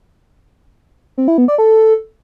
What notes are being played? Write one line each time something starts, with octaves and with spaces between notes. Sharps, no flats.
C4
E4
B3
D5
A4